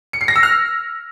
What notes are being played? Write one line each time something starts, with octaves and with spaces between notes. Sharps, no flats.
C#7
C7
A#6
E6
F6